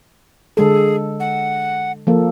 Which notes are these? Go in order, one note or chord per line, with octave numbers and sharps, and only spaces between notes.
D3 G#3 G#4 A4
F#5
F3 A#3 A4